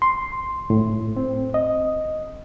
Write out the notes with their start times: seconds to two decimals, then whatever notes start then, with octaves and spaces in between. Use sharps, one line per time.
0.02 C6
0.70 A2
1.17 C4
1.54 D#5